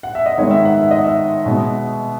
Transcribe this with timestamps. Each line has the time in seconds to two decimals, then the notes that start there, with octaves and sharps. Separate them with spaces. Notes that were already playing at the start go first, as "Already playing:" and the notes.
0.03 F#5
0.15 E5
0.26 D#5
0.38 G#2 D#3 G#3 B3 C#5
0.51 E5
0.65 F#5
0.78 E5
0.91 D#5
1.04 E5
1.46 B2 G#3 B3